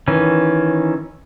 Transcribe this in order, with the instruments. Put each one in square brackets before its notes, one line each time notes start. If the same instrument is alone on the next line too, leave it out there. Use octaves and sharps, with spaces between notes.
[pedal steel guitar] D#3 E3 C#4